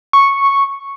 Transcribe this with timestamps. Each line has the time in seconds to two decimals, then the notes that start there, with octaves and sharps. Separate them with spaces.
0.13 C#6